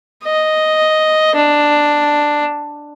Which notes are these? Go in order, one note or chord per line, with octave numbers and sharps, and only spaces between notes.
D#5
D4